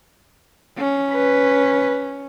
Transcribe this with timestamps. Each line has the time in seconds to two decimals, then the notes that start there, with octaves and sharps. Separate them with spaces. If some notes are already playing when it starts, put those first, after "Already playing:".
0.78 C#4
1.14 B4